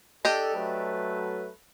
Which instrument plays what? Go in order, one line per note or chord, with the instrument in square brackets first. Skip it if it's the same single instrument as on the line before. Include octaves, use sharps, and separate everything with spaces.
[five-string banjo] D4 G4 D#5 [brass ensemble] A4
[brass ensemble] F#3 A3 B4